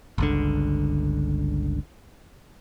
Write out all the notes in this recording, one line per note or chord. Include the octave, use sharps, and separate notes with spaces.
G1 C#2 D3